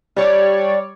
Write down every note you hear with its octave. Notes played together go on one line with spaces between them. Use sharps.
G3 D4 G4 C#5 D5